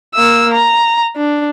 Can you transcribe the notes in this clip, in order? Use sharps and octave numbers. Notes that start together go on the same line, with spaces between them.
A#3 E6
A#5
D4